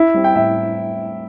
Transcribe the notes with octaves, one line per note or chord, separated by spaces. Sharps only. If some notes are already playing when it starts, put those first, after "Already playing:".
Already playing: E4
G3 C4
G5
A2 E5